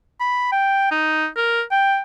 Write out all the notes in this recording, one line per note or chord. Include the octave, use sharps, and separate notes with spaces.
B5
G5
D#4
A#4
G5